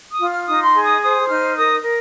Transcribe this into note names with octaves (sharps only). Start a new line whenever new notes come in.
D#6
F4
F6
D#4 D#6
C6
G#4
D#6
C5 D#6
D#4 F6
A#4 D#6
A#4